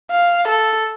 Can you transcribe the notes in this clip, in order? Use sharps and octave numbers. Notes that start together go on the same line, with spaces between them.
F5
A4